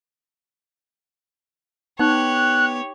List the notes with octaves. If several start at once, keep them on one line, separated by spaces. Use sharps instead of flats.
B3 D#4 G4 C#5 F#6